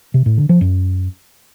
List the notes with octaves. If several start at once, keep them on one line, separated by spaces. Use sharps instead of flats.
C3
A2
D3
F3
F#2